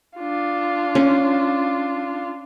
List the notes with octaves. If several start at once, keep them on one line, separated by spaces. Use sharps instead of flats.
D4 F4
C#4